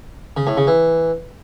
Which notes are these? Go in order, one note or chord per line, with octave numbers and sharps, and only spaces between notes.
C#3
A2
C#3
E3